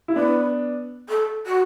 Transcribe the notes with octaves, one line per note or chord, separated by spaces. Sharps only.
E4
B3 D4 B4
A4
F#4